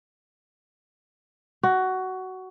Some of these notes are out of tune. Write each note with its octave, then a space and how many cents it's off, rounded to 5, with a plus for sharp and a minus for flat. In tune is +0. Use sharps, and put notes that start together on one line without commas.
F#4 +15